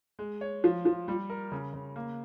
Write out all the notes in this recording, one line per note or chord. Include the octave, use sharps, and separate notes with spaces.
G#3
C#5
F3
F3
G3
A#4
C#3
C#3
A#3